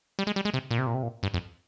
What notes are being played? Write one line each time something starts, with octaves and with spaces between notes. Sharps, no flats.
G3
G#3
G3
G#3
C3
A#2
C3
A#2
C3
A#2
G2
F2